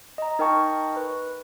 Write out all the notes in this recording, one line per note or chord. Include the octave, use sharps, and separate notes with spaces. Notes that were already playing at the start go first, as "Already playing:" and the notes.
D#5 A#5
D#4 A#4 D#5 G5 A5 C#6
B4